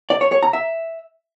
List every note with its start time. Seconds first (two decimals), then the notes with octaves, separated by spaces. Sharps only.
0.10 D5
0.21 C#5
0.32 C#5
0.43 A#5
0.53 E5